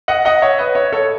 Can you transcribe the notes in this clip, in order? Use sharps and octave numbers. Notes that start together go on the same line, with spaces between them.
D#5 F#5
D#5 F#5
C#5 E5
B4 D#5
C#5 E5
A4 C#5